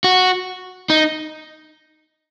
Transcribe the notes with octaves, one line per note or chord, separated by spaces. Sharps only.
F#4
D#4